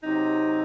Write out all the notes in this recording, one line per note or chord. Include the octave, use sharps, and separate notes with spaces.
C3 F#3 C4 D#4